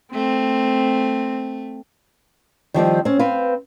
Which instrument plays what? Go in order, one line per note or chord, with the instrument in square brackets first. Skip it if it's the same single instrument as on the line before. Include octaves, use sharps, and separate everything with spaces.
[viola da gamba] A3 [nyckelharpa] C4
[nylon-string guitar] D#3 F3 G3 C4
C4 C#4
C4 B4 F5